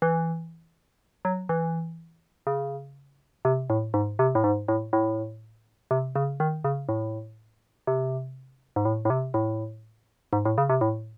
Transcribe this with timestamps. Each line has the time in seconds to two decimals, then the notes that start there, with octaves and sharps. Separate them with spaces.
0.02 E3
1.25 F#3
1.49 E3
2.47 C#3
3.45 C3
3.70 A2
3.94 G#2
4.19 C3
4.35 A2
4.44 G#2
4.68 A2
4.93 A2
5.91 C3
6.16 C#3
6.40 D#3
6.65 C#3
6.89 A2
7.87 C3
8.76 G#2
8.85 A2
9.05 A2
9.10 C3
9.34 A2
10.33 G#2
10.45 A2
10.58 C#3
10.70 C3
10.81 A2